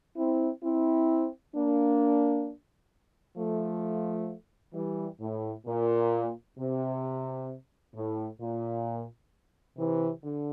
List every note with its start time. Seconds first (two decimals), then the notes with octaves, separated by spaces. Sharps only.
0.16 C4 E4
0.62 C4 E4
1.54 A#3 D4
3.37 F3 A3
4.74 E3 G3
5.20 A2
5.66 A#2
6.58 C3
7.94 A2
8.39 A#2
9.77 C3 E3
10.23 D3